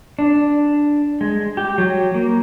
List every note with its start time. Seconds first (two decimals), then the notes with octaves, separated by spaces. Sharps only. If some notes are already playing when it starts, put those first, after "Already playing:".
0.19 D4
1.21 G#3
1.57 G4
1.78 F#3
2.14 A#3